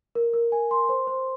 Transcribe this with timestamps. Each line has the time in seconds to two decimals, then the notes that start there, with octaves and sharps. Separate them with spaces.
0.15 A#4
0.33 A#4
0.52 G#5
0.71 C6
0.89 C5
1.07 C5